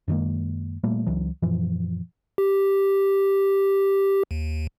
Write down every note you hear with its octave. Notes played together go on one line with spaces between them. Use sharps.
F#2 D#3 G#3 A#3
A#2 G3 A3 A#3
C#2 E3 F#3
F#2 A#2 E3 F3
G4
D#2